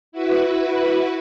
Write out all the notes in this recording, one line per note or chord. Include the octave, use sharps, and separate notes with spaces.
E4 F#4 B4